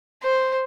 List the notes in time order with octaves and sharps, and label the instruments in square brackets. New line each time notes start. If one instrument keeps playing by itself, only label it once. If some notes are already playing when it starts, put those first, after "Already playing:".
[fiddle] C5